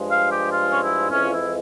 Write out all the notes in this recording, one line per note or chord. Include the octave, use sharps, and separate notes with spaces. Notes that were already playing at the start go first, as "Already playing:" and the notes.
Already playing: G2 F3 G#3
F5
G4
F4
C#4
E4
F2 E3 G#3 C#4
F4
E4